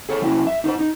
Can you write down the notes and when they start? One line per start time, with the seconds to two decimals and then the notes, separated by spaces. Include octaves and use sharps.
0.09 G#4 A4 C#5
0.22 F#3 C#4 E4
0.47 E5
0.64 D#4 A#4 C5
0.79 D#4